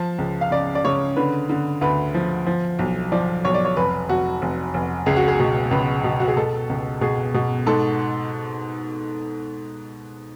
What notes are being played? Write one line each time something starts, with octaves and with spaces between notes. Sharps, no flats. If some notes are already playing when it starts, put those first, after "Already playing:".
Already playing: F3 A5
C#2
F5
C#3 D5
D5
C#3 C#5
D3 B4
D3
D2 B4
F3
F3
B1
F3 D5
B1 C#5
D5
C#5
F1 B4
F1 F#4
F1
F1
C#2 G#4
F#4
G#4
B2
C#2 B4
B2
F#4
G#4
B2 A4
C#2
B2 G#4
B2
G#2 A4